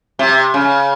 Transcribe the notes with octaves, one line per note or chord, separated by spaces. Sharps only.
C3
C#3